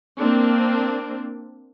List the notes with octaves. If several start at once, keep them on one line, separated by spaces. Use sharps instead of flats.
A#3 C4 D4